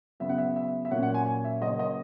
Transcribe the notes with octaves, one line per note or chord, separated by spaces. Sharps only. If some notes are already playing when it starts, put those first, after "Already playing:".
C#3 F#3 B3 E5
F#5
E5
E5
E5
A#2 F#3 A#3 C#4 F#5
F#5
G#5
G#5
E5
C#3 F#3 A#3 C#4 D#5
D#5